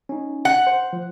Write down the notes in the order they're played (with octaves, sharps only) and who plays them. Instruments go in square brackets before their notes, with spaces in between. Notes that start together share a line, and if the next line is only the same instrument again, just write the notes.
[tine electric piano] C#4 D#4
[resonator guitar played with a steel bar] F#5
[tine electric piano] C5
F3